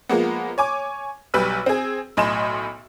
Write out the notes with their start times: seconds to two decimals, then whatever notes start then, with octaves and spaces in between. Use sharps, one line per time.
0.09 F3 G#3 A#3 B3
0.58 C#5 G#5 D6
1.34 B1 G3 B4 E6
1.66 C4 G#4
2.17 B1 A2 D#5 G#5 C6 E7